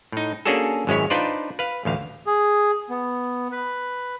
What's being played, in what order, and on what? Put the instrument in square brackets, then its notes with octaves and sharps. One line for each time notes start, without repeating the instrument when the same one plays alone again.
[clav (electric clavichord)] A2 D#4
A#3 C#4 D4 F#4 G#4 A4
G#1 F#2 G#3 C#4 E4 C#5
D4 D#4 F4 B4 C5 D5
B4 F5
A1 D2 F5
[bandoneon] G#4
B3
B4